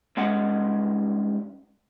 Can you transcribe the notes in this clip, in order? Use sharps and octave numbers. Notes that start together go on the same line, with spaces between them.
G2 G#3 C#4 F#5